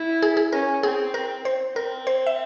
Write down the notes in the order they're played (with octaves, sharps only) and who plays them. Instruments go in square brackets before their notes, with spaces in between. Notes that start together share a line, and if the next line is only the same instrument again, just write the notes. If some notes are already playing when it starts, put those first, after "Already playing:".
Already playing: [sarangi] E4
[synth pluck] G#4
G#4
[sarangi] C#4 [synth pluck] A#4
[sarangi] C4 [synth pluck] G#4
[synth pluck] A#4
C5
[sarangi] C4 [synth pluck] A#4
[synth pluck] C5
E5